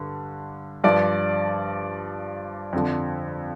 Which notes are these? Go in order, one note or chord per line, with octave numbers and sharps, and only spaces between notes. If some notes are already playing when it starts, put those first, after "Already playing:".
Already playing: G2 D3
G2 F3 D5
F2 D3 F3